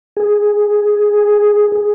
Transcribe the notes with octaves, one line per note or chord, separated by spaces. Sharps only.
G#4
G#4